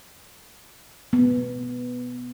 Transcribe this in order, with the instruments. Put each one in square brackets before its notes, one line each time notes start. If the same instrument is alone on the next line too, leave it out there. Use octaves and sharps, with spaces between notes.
[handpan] B3